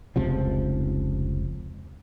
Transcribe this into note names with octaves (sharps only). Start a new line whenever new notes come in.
F1 C#2 C3 F3